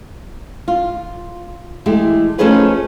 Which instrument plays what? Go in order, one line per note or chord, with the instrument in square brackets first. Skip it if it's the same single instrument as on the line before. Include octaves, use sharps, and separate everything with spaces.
[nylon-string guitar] F4
E3 G#3 A3 G4
F3 A3 C#4 D#4 G#4 B4